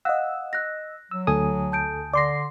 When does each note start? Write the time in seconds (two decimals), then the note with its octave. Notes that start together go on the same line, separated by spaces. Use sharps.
0.05 D#5 F5 F#5 E6 F#6
0.53 F#6 A#6
1.11 F#3 E6
1.27 D2 A4 G#5 D#6
1.72 A5 G6 D7
2.14 D3 D5 C6 D6 A#6 C7